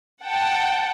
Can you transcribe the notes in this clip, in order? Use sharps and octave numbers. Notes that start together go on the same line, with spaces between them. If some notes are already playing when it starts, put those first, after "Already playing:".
F#5 G5 A5